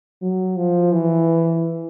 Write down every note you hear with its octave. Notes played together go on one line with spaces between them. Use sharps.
F#3
F3
E3